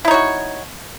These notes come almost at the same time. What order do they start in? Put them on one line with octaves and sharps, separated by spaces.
E4 D#4 C#5 F#4